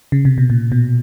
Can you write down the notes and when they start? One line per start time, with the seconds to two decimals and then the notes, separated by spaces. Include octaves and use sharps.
0.12 C#3
0.25 C3
0.38 B2
0.50 A#2
0.72 B2